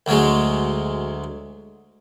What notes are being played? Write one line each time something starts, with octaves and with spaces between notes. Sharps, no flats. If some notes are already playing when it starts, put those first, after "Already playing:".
D2 F#3 G#3